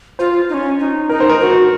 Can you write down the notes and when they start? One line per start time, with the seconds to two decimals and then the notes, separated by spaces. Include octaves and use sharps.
0.19 F4 C5
0.49 D#4
0.54 C#4
0.80 D#4
1.09 D#4 A#4
1.20 C5
1.29 A#4
1.41 F#4